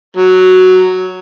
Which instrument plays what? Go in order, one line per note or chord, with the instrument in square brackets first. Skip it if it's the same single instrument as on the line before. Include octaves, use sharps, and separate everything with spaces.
[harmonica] F#3